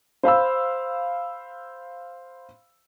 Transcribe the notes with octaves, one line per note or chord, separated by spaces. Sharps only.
C5 F5 B5 E6